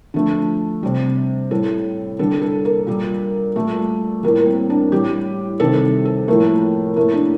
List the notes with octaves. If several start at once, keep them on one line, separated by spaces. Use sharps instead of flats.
D3 F3 A3
C3 G3
A2 G3 A4
D3 G3 A4
A4
A#3
A#2 G3
A#2 G3 A3
A2 G3 A#3
A#3
C4
D4
A2 G3 G4
C3 D#3 G3 A4
A4
A2 F3 A3 A#3
A2 A3 A#3
D4